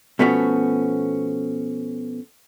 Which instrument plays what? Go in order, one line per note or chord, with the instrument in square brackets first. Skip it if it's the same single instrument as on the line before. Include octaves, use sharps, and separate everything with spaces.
[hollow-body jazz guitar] B2 F3 A3 B3 C#4 F#4